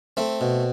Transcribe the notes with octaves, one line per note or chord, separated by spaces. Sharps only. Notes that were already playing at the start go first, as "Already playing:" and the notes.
A3 C4
B2